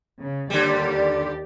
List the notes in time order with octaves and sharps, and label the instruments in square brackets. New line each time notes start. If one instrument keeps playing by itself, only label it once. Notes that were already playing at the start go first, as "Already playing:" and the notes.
[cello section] C#3
[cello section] D#2 G4 D5 [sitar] D3 G3